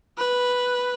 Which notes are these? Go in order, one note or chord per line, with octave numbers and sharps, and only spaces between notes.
B4